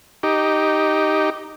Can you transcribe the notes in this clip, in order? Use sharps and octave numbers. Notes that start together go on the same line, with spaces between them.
D#4 G4